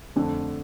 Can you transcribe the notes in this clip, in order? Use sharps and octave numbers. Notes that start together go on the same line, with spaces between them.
F2 D3 A3